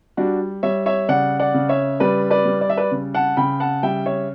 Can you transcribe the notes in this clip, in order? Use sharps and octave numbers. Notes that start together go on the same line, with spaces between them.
G3 D4 F#4
G3 C#5 E5
C#5 E5
C#3 D5 F#5
D5 F#5
C#3
C#5 E5
G3 B4 D5
B4 D5
G3
D5
E5
B4 D5
C#3
F#5 A5
C#3 G5 B5
F#5 A5
G3 E5 G5
C#5 E5